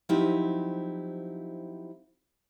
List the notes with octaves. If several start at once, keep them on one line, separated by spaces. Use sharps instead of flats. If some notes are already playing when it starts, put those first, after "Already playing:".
F3 F#3 C4 D#4 E4 G4